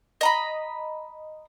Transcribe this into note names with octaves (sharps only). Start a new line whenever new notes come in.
D#5 A#5 B5